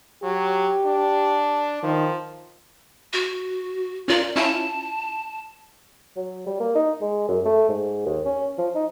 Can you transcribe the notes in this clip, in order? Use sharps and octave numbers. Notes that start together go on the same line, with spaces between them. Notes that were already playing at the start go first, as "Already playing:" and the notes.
F#3 G4
D4
D#3 F3
F#4
C#4 F4 A#4 D5
C#4 E4 F4 A5
F#3
G3
A#3
D#4
G#3
F#2
A3
G#2
D#2
C#4
F3
D#4